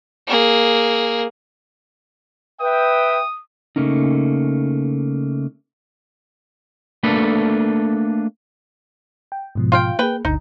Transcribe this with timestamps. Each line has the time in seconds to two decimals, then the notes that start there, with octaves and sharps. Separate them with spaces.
0.27 A#3 G#4
2.60 B4 E5 G5 D#6
3.76 C#3 A3 A#3 C#4 D#4
7.03 A3 A#3 D4 A4 B4
9.32 G5
9.55 G#2 B2 F3
9.72 F4 F5 G5
9.99 A#3 G#4 B4 G5
10.25 G1 D2 D3 D#4